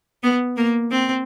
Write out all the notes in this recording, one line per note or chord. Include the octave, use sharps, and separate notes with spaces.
B3
A#3
C4